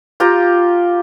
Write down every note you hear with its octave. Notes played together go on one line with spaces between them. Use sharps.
F4 G4 G5 A#5